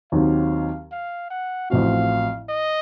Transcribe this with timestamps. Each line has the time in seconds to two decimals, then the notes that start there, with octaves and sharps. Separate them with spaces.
0.12 D#2 D#3 F#3 C4 F5
0.92 F5
1.30 F#5
1.70 A1 A2 F3 C4 F#4 F5
2.49 D#5